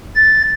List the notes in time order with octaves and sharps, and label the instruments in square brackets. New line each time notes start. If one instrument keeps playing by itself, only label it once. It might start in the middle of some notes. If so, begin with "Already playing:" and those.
[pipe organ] A6